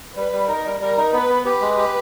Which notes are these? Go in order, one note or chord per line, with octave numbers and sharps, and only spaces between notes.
G3 B4
G3
D#4 A#4
G3
G3 A#4
D#4
B3 B4
B3
G4 B4
G#3
G4